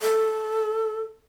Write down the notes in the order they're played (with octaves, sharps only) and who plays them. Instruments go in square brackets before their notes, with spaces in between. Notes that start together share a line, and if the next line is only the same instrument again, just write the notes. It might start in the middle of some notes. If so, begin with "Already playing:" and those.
[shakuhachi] A4